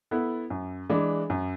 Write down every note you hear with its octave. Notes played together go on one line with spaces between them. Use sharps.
B3 E4 A4
F#2
E3 G#3 D4
F#2